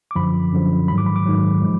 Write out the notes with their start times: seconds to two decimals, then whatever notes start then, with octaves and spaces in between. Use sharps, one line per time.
0.11 D6
0.16 F#2 D3 F3 B5
0.53 F#2 D3 F3
0.88 G#2 D#3 F#3 B5
0.98 D6
1.06 B5
1.16 D6
1.25 G#2 D#3 F#3
1.62 F3 G#3